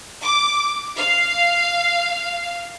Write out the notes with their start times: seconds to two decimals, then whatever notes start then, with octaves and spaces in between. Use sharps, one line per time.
0.23 D6
0.98 F5